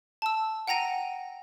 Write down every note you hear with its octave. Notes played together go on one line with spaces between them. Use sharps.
A5 E6
F#5 G5 A#5 A#6 D#7